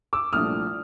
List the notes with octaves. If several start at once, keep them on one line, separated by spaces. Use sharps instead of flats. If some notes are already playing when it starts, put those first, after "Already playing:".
D6 E6
C2 A#2 F3 A3 D4 D#6 F6